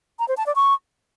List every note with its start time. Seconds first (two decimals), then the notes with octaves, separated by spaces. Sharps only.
0.19 A#5
0.28 C5
0.37 A5
0.46 D5
0.55 C#6